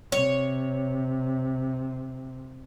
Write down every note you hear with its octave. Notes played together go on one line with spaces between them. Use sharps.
C3 C#5